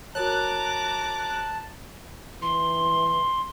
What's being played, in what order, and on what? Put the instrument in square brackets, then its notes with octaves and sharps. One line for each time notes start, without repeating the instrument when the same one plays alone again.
[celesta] F#4 A#4 C#5 [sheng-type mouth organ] A5 [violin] A#5 D6 [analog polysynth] F#6
[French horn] E3 [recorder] C6